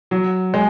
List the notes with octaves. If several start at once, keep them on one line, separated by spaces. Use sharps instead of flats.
F#3
G#3